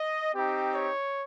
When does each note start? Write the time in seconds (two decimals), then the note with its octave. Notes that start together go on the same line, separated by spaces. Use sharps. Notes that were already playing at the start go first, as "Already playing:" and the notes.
Already playing: D#5
0.35 C4 D#4 G4
0.70 C#5